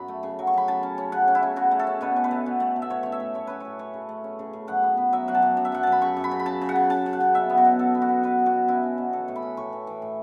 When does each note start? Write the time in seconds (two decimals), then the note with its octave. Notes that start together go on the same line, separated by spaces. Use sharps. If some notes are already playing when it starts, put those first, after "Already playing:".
Already playing: F#2 F#3 A5 B5
0.08 A3
0.23 C#3
0.39 F#3
0.47 C#6
0.54 F#2 B5
0.68 C#3 A5
0.83 C#4
0.98 C#4
1.12 C#3 F#5
1.28 C#4
1.35 E4
1.43 C#3
1.56 C#3 F#4
1.71 A3
1.79 A4
1.87 C#4
2.01 B2 B4
2.16 C#4
2.24 B4
2.31 A3
2.46 B2
2.60 A3
2.76 B2
2.82 E5
2.90 A2 C#5
3.03 C#4 C#5
3.12 E5
3.20 A2
3.34 A2 C#5
3.47 C#4 B4
3.60 A2 C#5
3.79 A3 C#5
3.94 C#3
4.09 A3
4.24 C#4
4.39 C#3
4.53 C#3
4.68 F#2 F#5
4.83 B3
4.97 B3
5.13 F#3 E5
5.28 F#3 F#5
5.35 A5
5.42 F#2
5.57 F#2
5.65 E5
5.72 F#2 F#5
5.83 F#2 A5
5.92 B5
6.02 C#3 C#6
6.16 F#2
6.24 B5
6.31 C#3
6.40 B5
6.46 C#3 A5
6.62 C#3
6.69 F#5
6.76 C#3
6.90 C#3 A5
7.06 C#3
7.13 F#5
7.20 C#3
7.35 B2 E5
7.50 B3
7.57 F#4
7.65 B2
7.79 B3 A4
7.95 B3
8.02 F#4
8.09 B3
8.23 B2 B4
8.39 B2
8.46 F#4
8.53 B2
8.68 C#4 E4
8.83 C#4
8.98 B2
9.13 E3 A4
9.28 A2
9.36 B5
9.43 C#4
9.57 A2 C#6
9.73 E3
9.87 E3
10.02 A2